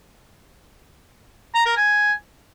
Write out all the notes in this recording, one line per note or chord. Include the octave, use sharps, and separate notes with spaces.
A#5
A#4
G#5